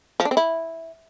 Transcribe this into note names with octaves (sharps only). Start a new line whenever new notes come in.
F3
D4
C4
E4